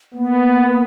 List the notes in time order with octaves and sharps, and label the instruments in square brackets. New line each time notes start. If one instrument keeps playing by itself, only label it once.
[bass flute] A#3 [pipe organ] B3